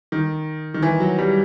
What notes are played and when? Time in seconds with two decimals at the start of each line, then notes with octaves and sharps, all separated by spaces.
0.12 D#3
0.74 D#3
0.82 E3
1.00 F#3
1.18 G3